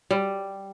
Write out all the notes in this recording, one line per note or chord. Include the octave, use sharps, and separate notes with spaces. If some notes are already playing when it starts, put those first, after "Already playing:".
G3